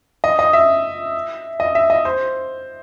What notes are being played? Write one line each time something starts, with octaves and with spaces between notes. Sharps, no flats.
D#5
D#5
E5
D#5
E5
D#5
C5